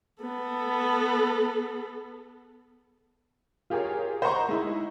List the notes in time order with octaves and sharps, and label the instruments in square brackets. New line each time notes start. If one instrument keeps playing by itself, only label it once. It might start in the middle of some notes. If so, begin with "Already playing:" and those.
[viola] B3 A4
[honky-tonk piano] F4 G4 G#4 A#4 C#5
C5 D#5 F#5 A#5 C#6
G#3 D#4 E4